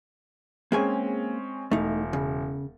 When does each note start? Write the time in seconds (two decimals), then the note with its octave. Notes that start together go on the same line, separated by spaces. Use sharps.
0.72 G#3 A#3 C4 C#4 G#4 G#5
1.71 E1 A3 D#4
2.13 C#3